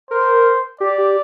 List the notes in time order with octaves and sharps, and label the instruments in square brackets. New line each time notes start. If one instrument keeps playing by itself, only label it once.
[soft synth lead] A#4 [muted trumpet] C5
[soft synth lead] G4 [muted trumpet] D5
[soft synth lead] G4